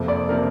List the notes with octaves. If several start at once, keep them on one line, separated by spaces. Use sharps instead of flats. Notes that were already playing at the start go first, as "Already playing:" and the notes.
Already playing: F2 C3 A#3
D5
C3 A#3 A#4